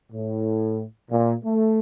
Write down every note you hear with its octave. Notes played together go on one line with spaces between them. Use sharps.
A2
A#2
A3